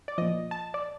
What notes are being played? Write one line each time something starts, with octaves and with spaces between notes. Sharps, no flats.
D5
A#2 F3 D#5
A5
D5